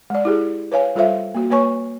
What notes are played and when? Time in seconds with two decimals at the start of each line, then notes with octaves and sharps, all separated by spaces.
0.10 G#3 D5
0.25 E4 G4 G#4
0.72 B4 C#5 F5 G#5
0.95 G3 F4 A4 C5 E5 F5
1.35 A#3 F#4
1.51 A#3 B4 C#5 G#5 C#6